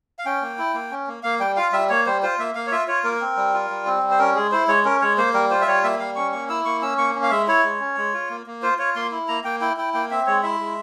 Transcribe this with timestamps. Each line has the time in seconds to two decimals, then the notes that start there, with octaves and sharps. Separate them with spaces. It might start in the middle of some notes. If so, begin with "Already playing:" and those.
0.19 F5
0.25 C#4 G5
0.42 A#3
0.58 E4
0.74 A#3
0.91 C#4
1.07 A#3
1.23 A#3 F5
1.40 G3 G5
1.56 F4 F5
1.72 G3 E5
1.89 A#3 C#5
2.06 G3 C5
2.23 F4 C5
2.39 A#3 E5
2.55 A#3 F5
2.67 C#5
2.72 F4 E5
2.88 F4 C#5
3.04 A#3 A#4
3.21 C4
3.37 G3
3.54 F4
3.70 G3
3.86 C4
4.03 G3
4.11 C5
4.19 C#4 A#4
4.35 G#3 G#4
4.52 E4 C5
4.68 G#3 C#5
4.85 C#4 A#4
5.01 G#3 C#5
5.17 A#3 C5
5.34 G3 A#4
5.50 F4 C5
5.61 E5
5.67 G3 C#5
5.84 A#3 E5
5.99 G3 F5
6.16 C#4 C#6
6.32 A#3 C#6
6.49 E4 E6
6.65 A#3 C#6
6.82 C#4 E6
6.98 A#3 C#6
7.15 C#4
7.23 F5
7.31 G#3 E5
7.48 E4 C#5
7.63 G#3
7.80 C#4
7.97 G#3
8.14 F4
8.30 A#3
8.46 A#3
8.62 F4 C5
8.78 F4 C#5
8.96 A#3 C6
9.12 E4
9.28 A#3 A#5
9.44 A#3 G5
9.61 E4 G5
9.77 E4 G5
9.94 A#3 G5
10.10 C4 E5
10.27 G#3 C#5
10.43 E4 E5
10.60 G#3